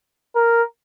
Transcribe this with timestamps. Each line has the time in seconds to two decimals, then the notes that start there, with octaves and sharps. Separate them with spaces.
0.35 A#4